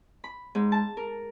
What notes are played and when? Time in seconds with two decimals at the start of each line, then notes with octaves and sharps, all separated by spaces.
0.24 B5
0.55 G#2
0.72 A5
0.97 A#4